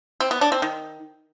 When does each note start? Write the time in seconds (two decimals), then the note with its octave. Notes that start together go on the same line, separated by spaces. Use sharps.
0.20 C4
0.31 B3
0.41 D4
0.52 C4
0.62 D#3